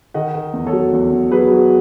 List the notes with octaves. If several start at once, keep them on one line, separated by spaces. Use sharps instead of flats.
D#3 D#5 F#5
D#3
E2
A4 C#5
F#3
E2
E2
F#3 G#4 B4
F#3